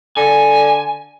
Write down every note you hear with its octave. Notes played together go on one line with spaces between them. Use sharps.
D3 G#5